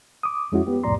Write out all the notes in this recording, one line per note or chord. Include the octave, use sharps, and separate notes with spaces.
D6 D#6
F2 G#3 C#4 E4 F#4
B3 G4
C2 F2 A2 D5 A#5 C6